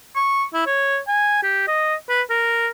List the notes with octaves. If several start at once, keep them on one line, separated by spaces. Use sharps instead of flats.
C#6
E4
C#5
G#5
G4
D#5
B4
A#4